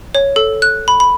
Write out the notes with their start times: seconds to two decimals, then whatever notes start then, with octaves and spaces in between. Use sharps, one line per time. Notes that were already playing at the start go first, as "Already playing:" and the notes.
0.15 C#5
0.36 A4
0.62 F#6
0.88 B5
1.00 B5